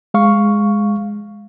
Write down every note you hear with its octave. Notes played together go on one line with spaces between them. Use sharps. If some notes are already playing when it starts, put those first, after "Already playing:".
G#3 F5 C#6